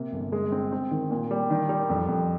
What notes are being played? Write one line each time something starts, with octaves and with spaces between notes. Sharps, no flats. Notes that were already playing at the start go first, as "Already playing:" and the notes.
Already playing: C3 A#3
G1
G#3
C4
C4
D#3
A#2
G3
D#3
G3
F2
F2